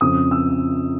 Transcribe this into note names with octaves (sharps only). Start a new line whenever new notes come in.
F2 C#3 F3 D#6
E6